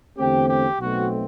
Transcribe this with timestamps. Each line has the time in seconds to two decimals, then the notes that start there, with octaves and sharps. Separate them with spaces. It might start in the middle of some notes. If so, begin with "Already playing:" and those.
0.17 E2 D3 A3 C4 G4
0.48 G4
0.80 B1 B2 A3 C4 F#4